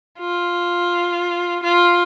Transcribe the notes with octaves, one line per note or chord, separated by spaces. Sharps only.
F4
F4